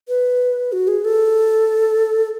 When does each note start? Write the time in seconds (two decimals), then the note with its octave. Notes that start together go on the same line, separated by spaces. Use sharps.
0.08 B4
0.72 F#4
0.88 G#4
1.05 A4